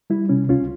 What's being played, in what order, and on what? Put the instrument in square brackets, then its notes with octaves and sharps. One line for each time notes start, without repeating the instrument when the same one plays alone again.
[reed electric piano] G3 E4
C3 C#4
C#2 C#4 F4